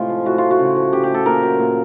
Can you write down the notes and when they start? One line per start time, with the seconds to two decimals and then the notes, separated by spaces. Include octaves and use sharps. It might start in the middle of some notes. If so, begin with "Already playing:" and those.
Already playing: A2 C3 G#3 F4
0.09 F3
0.26 A2 F#4
0.38 A3 F4
0.51 F#4
0.59 C#3
0.76 F3
0.93 C#3 G4
1.04 G4
1.10 A3 A4
1.26 A#2 A#4
1.43 F#3
1.59 A#2